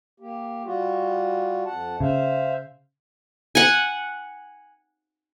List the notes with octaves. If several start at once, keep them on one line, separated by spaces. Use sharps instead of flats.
A#3 G4
G3 F4 F#4
F2 F#5 A5
C#3 C5 E5 F5
F#5 G#5